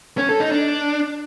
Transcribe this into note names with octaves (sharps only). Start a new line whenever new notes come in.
C#4
A4
D#4
D4